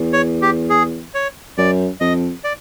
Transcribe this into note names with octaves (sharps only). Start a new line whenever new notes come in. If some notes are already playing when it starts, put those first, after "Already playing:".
Already playing: E2
C#5
G4
G#4
C#5
F#2 D5
F2 D#5
D5